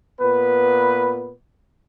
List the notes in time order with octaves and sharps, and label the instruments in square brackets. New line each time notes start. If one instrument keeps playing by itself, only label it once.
[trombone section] A#2 B3 B4